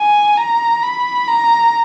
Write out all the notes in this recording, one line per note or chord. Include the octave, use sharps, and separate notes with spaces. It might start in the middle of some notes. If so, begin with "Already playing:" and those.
Already playing: G#5
A#5
B5
A#5